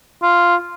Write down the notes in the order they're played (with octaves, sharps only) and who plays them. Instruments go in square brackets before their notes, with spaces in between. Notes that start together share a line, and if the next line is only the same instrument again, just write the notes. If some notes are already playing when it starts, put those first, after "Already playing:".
[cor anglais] F4